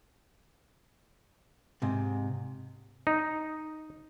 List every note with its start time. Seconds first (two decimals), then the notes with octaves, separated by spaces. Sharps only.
1.82 G#2 C3
3.07 D#4